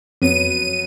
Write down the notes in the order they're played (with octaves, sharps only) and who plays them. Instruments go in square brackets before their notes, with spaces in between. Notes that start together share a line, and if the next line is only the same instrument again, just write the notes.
[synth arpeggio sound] F2 [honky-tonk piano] F#3 B3 [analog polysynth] D#7